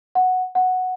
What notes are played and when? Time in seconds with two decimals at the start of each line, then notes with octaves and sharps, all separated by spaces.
0.15 F#5
0.55 F#5